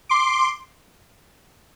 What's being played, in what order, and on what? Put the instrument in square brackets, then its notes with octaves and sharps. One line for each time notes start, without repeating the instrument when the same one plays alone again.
[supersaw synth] C6 D6